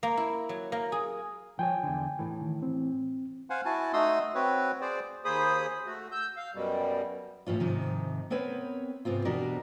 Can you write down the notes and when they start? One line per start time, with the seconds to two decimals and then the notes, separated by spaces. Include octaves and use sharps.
0.03 A#3
0.17 E4
0.49 F#3
0.72 A#3
0.92 G#4
1.59 F3 C#5 G5 G#5
1.83 E2 D3
2.19 A2 E3
2.42 D#3
2.62 C4
3.50 C5 F5 F#5 G#5
3.65 E4 F#4 G#5 A5
3.93 A3 D#4 F#4 C6 D#6 E6
4.35 C4 F#4 B4 C#5
4.81 G#4 C5 D5
5.25 D#2 A#3 G#4 C5 B5 D#6
5.86 A3 F#4
6.12 E6 G6
6.37 F5
6.54 F#2 B2 G3
7.47 A2 E3 C#4 F4
7.60 G#2 C3 D#3 F3
8.30 B3 C4 A#4 B4 C#5
9.05 G#2 C3 B3 C4 F4
9.25 E2 B2 D4 F#4 G4 A#4